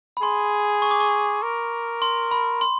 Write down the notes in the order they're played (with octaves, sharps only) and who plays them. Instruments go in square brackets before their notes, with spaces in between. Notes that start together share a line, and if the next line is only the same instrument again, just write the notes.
[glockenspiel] B5
[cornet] G#4 [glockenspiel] C6
[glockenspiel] C#6
D6
C#6
[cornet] A#4
[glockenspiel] C6
B5
C6